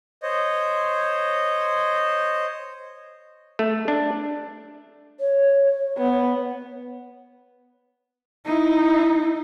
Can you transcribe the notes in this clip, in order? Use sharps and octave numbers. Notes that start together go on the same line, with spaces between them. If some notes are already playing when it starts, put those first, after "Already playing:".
C5 C#5 D#5
A3
D4
C#5
B3
D#4 E4